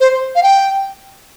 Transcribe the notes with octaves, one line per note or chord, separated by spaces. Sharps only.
C5
F5
G5